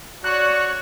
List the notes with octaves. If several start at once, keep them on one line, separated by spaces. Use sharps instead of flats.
F#4 C#5 D5 F#6